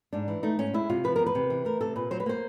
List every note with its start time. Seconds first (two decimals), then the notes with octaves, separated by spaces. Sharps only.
0.13 G#2 D4
0.28 E3
0.43 A3 D#4
0.59 G#2 C#4
0.74 G#3 E4
0.90 C3 F4
1.04 F3 B4
1.16 E2 A#4
1.26 B4
1.35 C3
1.50 E3
1.65 A3 A#4
1.81 C3 A4
1.96 A#2 B4
2.11 F#3 C5
2.20 B4
2.26 A#3 C5